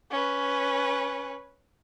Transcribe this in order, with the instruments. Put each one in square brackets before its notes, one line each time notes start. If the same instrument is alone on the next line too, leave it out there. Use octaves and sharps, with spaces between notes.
[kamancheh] C#4 B4